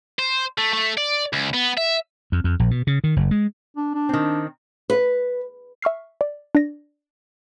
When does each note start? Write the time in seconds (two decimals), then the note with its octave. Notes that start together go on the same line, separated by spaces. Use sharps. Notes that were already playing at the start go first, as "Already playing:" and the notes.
0.19 C5
0.58 A3
0.73 A3
0.97 D5
1.33 C#2
1.54 B3
1.77 E5
2.32 F2
2.44 F2
2.60 A#1
2.71 B2
2.87 C#3
3.04 D#3
3.16 F#1
3.31 G#3
3.77 D4
3.94 D4
4.09 D#3 C4
4.90 B4
5.82 E5 C#6 F6 C7
6.21 D5
6.55 D4 D5 A#6